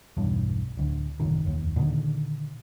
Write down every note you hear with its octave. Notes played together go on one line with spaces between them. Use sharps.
B1 E2 G2
D1 D2
A1 F#2 C3 D#3
F1 D#2
A#2 D3 D#3